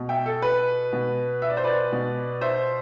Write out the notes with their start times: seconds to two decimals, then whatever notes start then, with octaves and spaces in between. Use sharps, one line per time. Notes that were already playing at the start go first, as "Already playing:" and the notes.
Already playing: B2
0.09 E5 G5
0.26 A4
0.42 B4
0.93 B2
1.42 E5
1.49 D5
1.57 C5
1.64 B4 D5
1.92 B2
2.41 C5 E5